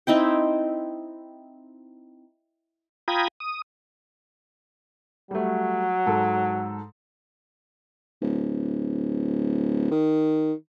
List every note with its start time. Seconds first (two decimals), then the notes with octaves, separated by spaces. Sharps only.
0.07 C4 D#4 E4 G5
3.08 F4 G5 A#5 B5 D#6 G#6
3.40 D#6
5.31 F#3 G3 A3
6.06 G#2 A4
8.21 D1
9.91 D#3